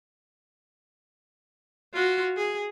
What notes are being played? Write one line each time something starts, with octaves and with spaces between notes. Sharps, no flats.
F4 F#4
G#4